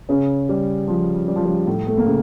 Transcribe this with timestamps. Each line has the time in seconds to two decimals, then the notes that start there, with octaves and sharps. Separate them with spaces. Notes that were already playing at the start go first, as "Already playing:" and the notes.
0.09 C#3 C#4
0.49 G3
0.88 F3
1.28 G3
1.36 F3
1.45 G3
1.67 A2 A3
1.87 A3
1.97 A#3
2.06 C#3